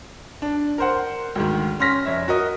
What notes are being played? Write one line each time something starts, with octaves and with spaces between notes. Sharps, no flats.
D4
A#4 C5 F#5
D2 G#2 D#3
C#4 C6 F6 A#6 B6
F1 C#5 E5
F#4 A#4 D#5